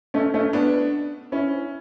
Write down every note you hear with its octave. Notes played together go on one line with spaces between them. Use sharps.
A3 C#4
A3 C#4
B3 D4
C#4 E4